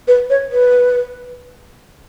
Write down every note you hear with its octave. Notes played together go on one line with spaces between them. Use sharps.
B4
C#5
B4